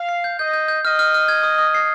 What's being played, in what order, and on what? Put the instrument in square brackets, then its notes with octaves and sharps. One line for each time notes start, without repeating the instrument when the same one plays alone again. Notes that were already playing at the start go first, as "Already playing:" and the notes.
Already playing: [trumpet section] F5
[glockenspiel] C7
G6
[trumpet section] D#5 [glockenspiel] G6
[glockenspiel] G6
G6
[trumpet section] D#5 [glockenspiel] F6
[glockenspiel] F6
F6
G#6
D#6
D#6
C7